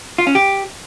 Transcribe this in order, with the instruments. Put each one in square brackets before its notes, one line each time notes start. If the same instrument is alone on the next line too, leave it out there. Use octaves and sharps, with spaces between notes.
[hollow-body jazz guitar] F4
C#4
G4